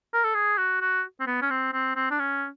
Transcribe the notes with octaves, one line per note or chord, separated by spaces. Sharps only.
A#4
A4
G#4
F#4
F#4
C4
B3
C#4
C4
C4
C4
D4
C#4